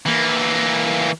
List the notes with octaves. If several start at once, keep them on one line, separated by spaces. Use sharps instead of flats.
E3 A#3